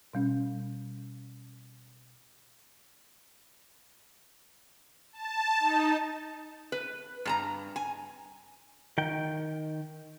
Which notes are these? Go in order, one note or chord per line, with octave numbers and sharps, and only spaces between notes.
B2 G3 C#4
A5
D#4
B4
G2 A5 A#5
G#5
D#3 G5